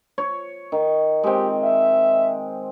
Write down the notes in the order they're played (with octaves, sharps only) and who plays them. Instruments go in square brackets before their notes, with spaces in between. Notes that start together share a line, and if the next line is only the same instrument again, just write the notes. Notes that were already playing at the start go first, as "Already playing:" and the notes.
[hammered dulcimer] C#5
D#3
[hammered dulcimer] G#3 C4 [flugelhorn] G4
[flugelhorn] E5